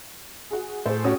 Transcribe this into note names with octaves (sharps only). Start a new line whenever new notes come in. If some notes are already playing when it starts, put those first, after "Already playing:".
F#4 G#4
A2 G#4 C5
C#4 F#4 G4 D#6